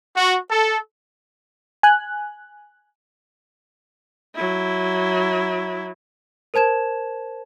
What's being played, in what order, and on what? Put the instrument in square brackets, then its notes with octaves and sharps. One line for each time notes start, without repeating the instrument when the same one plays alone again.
[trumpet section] F#4
A4
[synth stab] G#5 F#6
[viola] F#3 E4
[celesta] A#4 C5 A5 G#6 E7